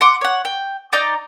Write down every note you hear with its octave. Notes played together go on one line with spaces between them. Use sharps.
F#5 C6 D6
C#5 F#5
G5
D#4 D5 A#5 G6